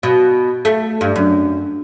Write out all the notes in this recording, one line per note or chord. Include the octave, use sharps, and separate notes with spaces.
B2
A3
G2
F#2